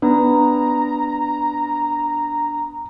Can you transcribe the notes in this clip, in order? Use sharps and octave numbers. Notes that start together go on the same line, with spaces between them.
B3 D4 A#5